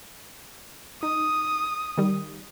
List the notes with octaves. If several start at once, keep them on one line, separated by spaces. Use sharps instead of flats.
D#4 D#6
D#3 G3